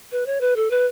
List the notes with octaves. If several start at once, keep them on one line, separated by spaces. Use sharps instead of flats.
B4
C#5
B4
A4
B4